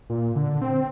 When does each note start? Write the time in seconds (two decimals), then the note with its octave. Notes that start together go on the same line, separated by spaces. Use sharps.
0.10 A#2
0.36 D3
0.62 C4